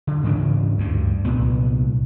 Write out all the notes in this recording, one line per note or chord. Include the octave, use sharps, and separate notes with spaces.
D3
G#2 C#3 E3 D4
D2 G2
C2 A#2 B3